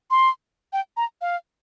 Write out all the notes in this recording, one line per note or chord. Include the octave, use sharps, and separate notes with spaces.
C6
G5
A#5
F5